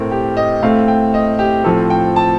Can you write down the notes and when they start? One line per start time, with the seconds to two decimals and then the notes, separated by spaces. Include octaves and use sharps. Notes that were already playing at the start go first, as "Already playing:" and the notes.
Already playing: A2 A3 C4 A#4
0.11 G4
0.37 D#5
0.62 A2 A3 C4 F5
0.88 G5
1.14 D#5
1.39 G4
1.64 A2 F3 C4 A4
1.90 G5
2.16 A5